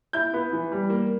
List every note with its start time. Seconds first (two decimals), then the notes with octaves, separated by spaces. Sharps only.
0.13 E4 G6
0.33 B3
0.53 E3
0.72 G3
0.90 A#3